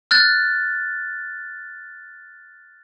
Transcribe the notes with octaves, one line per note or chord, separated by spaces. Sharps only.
F6 F#6 A6